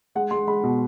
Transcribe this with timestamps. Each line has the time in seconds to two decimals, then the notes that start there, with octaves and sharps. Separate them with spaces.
0.15 G#3 F#5
0.31 G#3 C6
0.47 G#3 B5
0.64 B2